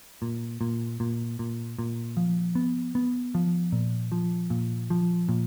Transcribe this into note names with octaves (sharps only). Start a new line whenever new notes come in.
A#2
A#2
A#2
A#2
A#2
F3
B3
B3
F3
A#2
F3
A#2
F3
A#2